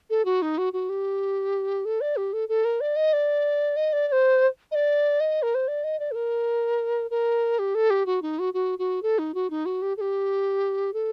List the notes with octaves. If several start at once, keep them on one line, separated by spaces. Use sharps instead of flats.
A4
F#4
D#4
F#4
F#4
G4
A4
D5
G4
A4
A4
A#4
D5
D#5
D5
D#5
D5
D5
C5
D#5
D5
D#5
A#4
C5
D5
D#5
D5
A4
A#4
A#4
G4
A4
G4
F#4
D#4
F#4
F#4
F#4
A4
D#4
F#4
D#4
F#4
G4
A4
G4
A4